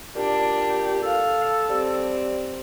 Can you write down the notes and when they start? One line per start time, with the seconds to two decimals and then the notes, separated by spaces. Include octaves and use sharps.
0.16 A#2 D4 G4
1.03 A4 F5
1.70 G3 C4